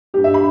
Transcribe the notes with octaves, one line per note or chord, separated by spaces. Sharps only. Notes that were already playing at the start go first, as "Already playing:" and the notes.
G2 G3 G4
E5
B5